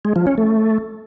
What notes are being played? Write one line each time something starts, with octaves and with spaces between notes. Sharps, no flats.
G#3
F3
C#4
A3